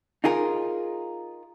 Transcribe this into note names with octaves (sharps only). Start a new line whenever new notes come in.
D#4 F4 G#4 A#4